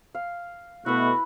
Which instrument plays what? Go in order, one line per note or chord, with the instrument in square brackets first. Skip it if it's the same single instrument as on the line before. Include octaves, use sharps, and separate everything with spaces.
[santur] F5
[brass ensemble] B2 A3 [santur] E4 B4 [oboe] F#4